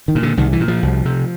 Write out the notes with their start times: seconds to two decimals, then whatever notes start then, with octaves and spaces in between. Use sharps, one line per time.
0.08 D#3
0.15 A#2
0.23 D3
0.37 C2 D#3
0.53 E3
0.60 A#2
0.68 F3
0.83 C2
1.05 C3